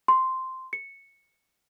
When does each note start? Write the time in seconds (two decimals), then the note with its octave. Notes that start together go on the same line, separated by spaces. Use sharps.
0.08 C6
0.73 C#7